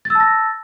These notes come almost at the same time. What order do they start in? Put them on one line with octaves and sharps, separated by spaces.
A6 E6 A5 A#6